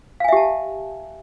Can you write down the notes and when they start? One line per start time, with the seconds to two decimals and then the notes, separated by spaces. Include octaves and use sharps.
0.20 F5
0.24 G#5
0.28 E5
0.33 G4
0.37 A5